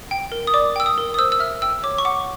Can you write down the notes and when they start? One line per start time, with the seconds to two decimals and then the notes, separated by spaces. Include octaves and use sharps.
0.11 G5
0.32 A#4
0.47 D#6
0.54 D5 D6
0.76 G5 E6
0.86 D#6
0.98 A#4
1.14 D#6
1.18 C5 E6
1.32 E6
1.40 E5 F6
1.62 G5 E6
1.83 C#5 D6
1.98 C#6
2.05 F#5 D6